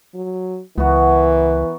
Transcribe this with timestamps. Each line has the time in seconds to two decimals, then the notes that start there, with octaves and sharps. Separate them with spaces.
0.15 F#3
0.78 C#2 E3 B3 F#4 A#4